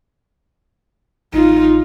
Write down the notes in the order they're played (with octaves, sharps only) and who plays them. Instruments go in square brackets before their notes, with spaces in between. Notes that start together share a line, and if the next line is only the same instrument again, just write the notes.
[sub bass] A1 [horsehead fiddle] D#4 F4